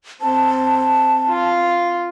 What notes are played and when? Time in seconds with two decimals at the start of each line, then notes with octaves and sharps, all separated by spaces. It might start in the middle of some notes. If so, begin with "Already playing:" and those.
0.22 C4 A5
1.28 F4 F5